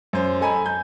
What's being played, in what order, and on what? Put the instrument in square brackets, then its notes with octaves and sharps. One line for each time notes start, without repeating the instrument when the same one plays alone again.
[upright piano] F#2 C5
A4 D#5 G#5 A#5 B5
G6